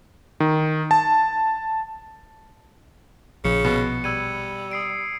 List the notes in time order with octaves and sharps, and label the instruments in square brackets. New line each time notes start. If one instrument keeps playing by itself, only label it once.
[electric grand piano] D#3
A5
[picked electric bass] A#1 F3 [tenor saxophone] C#3 [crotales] C#7
[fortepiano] B2
[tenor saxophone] G3 [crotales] E6 G#6 D#7
[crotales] D#6 C7 D7